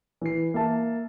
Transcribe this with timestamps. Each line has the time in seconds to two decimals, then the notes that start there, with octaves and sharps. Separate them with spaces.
0.22 E3 C7
0.54 A#3 E5 A5